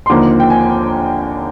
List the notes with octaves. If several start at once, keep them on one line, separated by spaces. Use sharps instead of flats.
C6
D#2 D3 F3 A#3 D#4 D6
G5
G#5